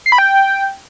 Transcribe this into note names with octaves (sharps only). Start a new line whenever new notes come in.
C7
B5
G5